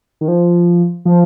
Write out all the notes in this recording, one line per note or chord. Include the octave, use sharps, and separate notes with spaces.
D#3
F3
F3